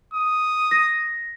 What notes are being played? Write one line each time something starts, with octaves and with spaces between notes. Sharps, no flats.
D#6
A#6